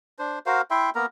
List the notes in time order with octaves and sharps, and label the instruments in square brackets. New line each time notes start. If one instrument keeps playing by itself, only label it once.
[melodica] D4 C5
F#4 A#4 C5 F5
E4 E5 G5 C6
A#3 B3 A#4 A#5